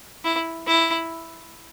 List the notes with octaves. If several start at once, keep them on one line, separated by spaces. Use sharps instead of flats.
E4
E4